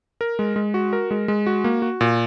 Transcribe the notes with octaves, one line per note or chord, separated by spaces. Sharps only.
A#4
G#3
G#3
F#4
A#4
G#3
G#3
F#4
A#3
F#4
A#2